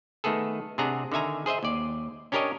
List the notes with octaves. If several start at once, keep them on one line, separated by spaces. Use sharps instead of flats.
D#3 A3 B3 G#4 A4
C3 D4 G#4 F#5 A#5
D3 D#3 E5 G#5 A#5
G#4 C5 D#5 E5
D#2 D5
C#4 D4 G4 A#4 C#5 D#5